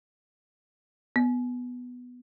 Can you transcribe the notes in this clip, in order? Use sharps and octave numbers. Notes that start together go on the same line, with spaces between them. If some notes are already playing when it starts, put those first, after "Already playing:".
B3